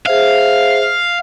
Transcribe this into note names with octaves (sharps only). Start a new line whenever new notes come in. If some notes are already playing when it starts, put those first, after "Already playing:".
G#4 C5 E5 F5